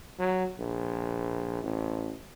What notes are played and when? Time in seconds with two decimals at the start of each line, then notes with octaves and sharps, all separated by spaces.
0.19 F#3
0.59 A#1
1.64 A1